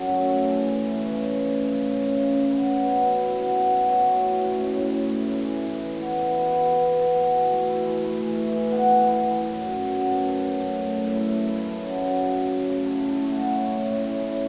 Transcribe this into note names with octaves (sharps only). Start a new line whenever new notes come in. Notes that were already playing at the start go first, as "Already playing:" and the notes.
Already playing: F#2 F#3 A4
A3
A3
E3
E3
E3
C#4
C#3
A3
C#3
C#3
C#3
C#3
C#3
C#4
B3 B4
B3
B2
B3
E4
B3
B2
B3
B2 C#5
A3
E4
C#4
A2
A2
C#4
A3
E4
E3
E3
E3
B3 B4
E4
B2
B2
B3
B2
B2
B2
E3
A3
E4
E3
A3
E3
E3
E3
B3 F#5
E3
B3
E3
F#2
F#2
F#2
B3
A3 A5
F#2
F#2
A3
A3
A2
E4
A3
C#3 A5
C#3
F#3
F#3
C#3
C#4
A3
C#3
E4 A5
E4
A5
A3
F#5
A3
C#4 C#5
E4
A2
C#4
E4